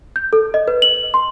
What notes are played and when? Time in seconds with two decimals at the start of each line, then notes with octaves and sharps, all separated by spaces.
0.16 G6
0.33 A4
0.54 D#5
0.68 B4
0.82 F#7
1.14 C6